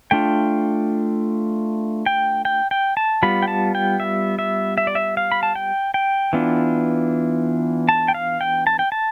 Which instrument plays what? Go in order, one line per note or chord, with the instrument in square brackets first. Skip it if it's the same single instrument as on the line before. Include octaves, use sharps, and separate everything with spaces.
[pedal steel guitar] A3 D4 F4 G5
G5
G5
G5
A5
G3 B3 F4 B5
G5
A5
G5
E5
E5
E5
D5
E5
F5
B5
A5
G5
G5
E3 B3 D4 F4
A5
G5
F5
G5
A5
G5
A5